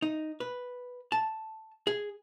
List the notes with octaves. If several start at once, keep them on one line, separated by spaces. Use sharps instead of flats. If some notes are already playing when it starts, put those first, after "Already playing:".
D#4
B4
A5
G#4